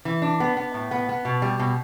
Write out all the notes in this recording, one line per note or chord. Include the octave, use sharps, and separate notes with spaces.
E3
D4
B3
B3
A2
B3
B3
B2
G3
B2